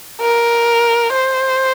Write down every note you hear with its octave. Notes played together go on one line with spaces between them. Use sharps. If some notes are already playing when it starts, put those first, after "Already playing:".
A#4
C5